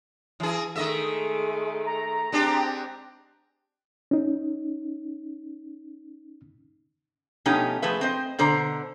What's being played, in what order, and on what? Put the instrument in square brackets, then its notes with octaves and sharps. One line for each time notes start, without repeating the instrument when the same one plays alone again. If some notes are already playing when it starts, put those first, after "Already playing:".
[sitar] E3 G#4
[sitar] D#3 D#5 E5 [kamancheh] G#3 A3
[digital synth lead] A#5
[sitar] G#3 D4 G4 [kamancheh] C4
[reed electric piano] C#4 D#4
[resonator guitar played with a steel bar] B2 F3 A3 C#4 D#4 G4
F3 A3 G#4 B4 E5
C4 C5 D#5
B2 D3 C5 D5 A#5